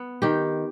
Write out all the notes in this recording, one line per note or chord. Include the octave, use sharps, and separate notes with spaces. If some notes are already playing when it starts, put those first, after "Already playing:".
Already playing: B3
D#3 G4